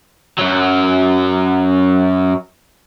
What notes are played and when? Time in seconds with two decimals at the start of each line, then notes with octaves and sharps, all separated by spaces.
0.38 F#2 F#3